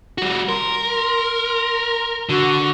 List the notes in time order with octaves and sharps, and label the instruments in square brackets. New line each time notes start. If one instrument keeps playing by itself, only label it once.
[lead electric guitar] G3 F#4
[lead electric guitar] A#4 [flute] C6
[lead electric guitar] D3 [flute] F#4